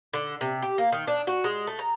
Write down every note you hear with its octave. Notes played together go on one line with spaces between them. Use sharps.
D3
C3
G4
A#3
D#3
D4
F#4
G#3
A3
A#5